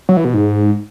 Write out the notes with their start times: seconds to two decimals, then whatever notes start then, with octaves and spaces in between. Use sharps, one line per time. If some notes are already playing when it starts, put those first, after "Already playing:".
0.09 F#3
0.17 E3
0.25 B2
0.34 G#2